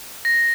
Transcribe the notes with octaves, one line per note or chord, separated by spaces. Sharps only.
A#6